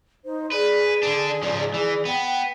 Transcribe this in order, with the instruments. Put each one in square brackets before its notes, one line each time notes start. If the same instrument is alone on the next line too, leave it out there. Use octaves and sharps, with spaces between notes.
[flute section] D#4 C5
[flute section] G#4 D5 [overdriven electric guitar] B4
[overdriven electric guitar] D3 D4
C#2 F3
E3
[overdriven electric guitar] B3 [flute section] G5